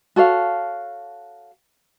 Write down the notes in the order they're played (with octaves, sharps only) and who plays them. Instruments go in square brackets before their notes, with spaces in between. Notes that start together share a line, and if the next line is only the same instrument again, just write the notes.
[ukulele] F#4 A4 C#5 F5